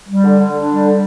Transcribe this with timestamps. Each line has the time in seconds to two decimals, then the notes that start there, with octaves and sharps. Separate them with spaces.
0.08 G3
0.24 D3
0.40 D3
0.54 D4
0.70 G3
0.85 D3